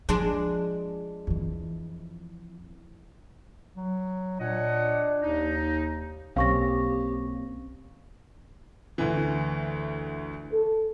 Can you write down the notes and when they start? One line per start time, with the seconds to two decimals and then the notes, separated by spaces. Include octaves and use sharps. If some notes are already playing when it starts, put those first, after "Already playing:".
0.09 F3 G#3 D4
1.27 F2 E3
3.76 F#3
4.40 A#2 D4 C#5 D#5 F#5
5.22 D#2 D#4
6.36 B1 A#3 C4 C#4 G4 F5 C#6 A#6
8.98 D2 E3
10.52 A4